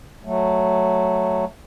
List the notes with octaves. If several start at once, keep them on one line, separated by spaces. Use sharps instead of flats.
F#3 A3